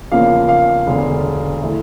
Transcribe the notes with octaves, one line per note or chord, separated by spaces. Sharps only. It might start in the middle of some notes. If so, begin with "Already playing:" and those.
E2 C#3 F3 A#3 F5
F5
E1 D2 D3
E3 A3